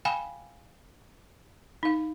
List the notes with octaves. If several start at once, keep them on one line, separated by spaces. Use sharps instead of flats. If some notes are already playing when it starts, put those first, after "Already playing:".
F5 G5 G#5 B5
D#4 F5